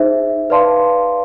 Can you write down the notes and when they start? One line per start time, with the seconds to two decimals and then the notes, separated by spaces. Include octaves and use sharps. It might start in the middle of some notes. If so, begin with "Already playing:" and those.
Already playing: D#4 G#4 C5 E5
0.50 B4 D5 F5 A5 C6